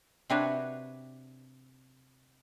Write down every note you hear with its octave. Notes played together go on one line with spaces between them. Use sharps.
C3 C4 D4 F#4 B4 C#5